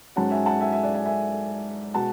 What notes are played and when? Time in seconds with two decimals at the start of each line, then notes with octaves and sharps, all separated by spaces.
0.16 G#2 F#3 C#4 F#5 A5
0.31 E5 G#5
0.46 F#5 A5
0.60 E5 G#5
0.72 E5 G#5
0.83 D5 F#5
0.94 E5 G#5
1.05 E5 G#5
1.94 B2 G#3 F#5 A5